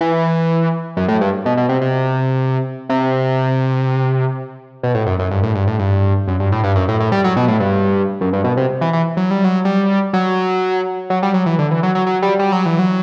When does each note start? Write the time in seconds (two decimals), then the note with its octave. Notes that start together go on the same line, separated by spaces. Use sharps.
0.01 E3
0.97 F#2
1.08 A2
1.21 G2
1.46 B2
1.57 B2
1.69 C3
1.81 C3
2.89 C3
4.83 B2
4.95 A2
5.07 F#2
5.19 F#2
5.31 G2
5.43 A2
5.55 G2
5.67 A2
5.79 G2
6.28 F#2
6.40 G2
6.52 A2
6.64 G2
6.76 F#2
6.89 A2
7.00 A2
7.12 G3
7.24 F#3
7.36 B2
7.48 A2
7.60 G2
8.21 F#2
8.33 G2
8.44 B2
8.57 C3
8.81 E3
8.93 E3
9.17 F#3
9.31 G3
9.44 F#3
9.65 G3
10.13 F#3
11.10 F#3
11.23 G3
11.34 F#3
11.46 E3
11.59 D3
11.71 E3
11.83 F#3
11.95 F#3
12.06 F#3
12.22 G3
12.39 G3
12.52 F#3
12.66 E3
12.79 F#3